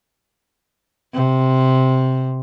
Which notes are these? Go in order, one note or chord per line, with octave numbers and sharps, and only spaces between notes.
C3